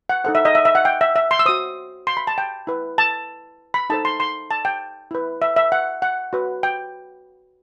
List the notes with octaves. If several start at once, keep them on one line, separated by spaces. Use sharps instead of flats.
F#5
D#4 A4 C5 F#5
E5
D#5
E5
E5
F#5
G5
E5
E5
C6
E6
F#4 C5 D#6
C6
B5
A5
G5
E4 B4
A5
B5
D#4 A4 C5 A5
C6
C6
A5
G5
E4 B4
E5
E5
F#5
F#5
F#4 B4
G5